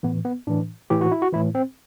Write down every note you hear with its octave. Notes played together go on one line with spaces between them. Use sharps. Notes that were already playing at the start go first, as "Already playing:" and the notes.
A2 E3 B3
B3
A2 E3 D4
A2 E3 G4
F#4
E4
F#4
A2 E3 E4
C4